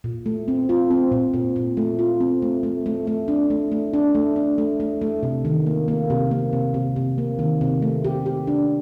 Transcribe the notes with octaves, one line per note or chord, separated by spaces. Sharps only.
A#2
A3
C4
F4
C4
A#2
A#2
A#2
A3
F4
C4
A3
A3
A3
A3
D4
A3
A3
D4
A3
D4
A3
A3
A3
C3
D#3
A#3
A#3
C3
A#3
C3
C3
C3
A#3
D#3
C3
A3
G4
G4
D4